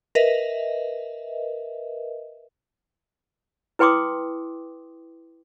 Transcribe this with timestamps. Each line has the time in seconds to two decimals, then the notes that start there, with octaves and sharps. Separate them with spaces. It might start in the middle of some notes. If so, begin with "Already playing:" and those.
0.15 A#4 B4 D#5 E5
3.79 E4 B4 G5 C6 D6 D#6